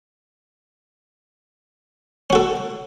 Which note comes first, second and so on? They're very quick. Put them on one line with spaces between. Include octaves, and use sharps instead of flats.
C#4 F#4 A4